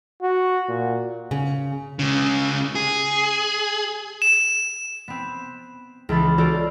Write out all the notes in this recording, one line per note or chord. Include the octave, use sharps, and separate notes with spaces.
F#4
A#2
C#3
C#2 C#3
G#4
E7
B3 C4
C#2 E3 B5 A6
F4 F#4 A4 A#4 C5 D5